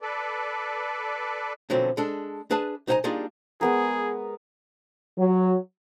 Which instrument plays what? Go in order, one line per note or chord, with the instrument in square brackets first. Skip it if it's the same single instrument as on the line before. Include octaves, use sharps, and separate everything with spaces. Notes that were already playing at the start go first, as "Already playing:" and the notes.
[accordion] A4 B4 D5
[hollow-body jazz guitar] B2 D3 F3 F#3 C4 C#4
G#3 D4 A4
D4 G#4 B4 E5 A5
C2 D#4 C5 E5 G#5 A#5
G3 A#3 D4 D#4 F4 G#4
[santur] G#3 B3 A#4 [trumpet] G#4
[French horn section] F#3